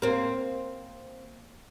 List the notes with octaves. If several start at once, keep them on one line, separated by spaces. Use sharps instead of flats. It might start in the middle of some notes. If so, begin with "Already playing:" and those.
A#3 C4